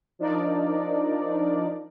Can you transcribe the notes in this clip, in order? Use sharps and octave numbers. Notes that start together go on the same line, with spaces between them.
F3 D4 D#4 A#4 D5